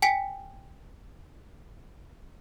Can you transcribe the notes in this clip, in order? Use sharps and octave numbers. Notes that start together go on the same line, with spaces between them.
G5 G#5 B6 C#7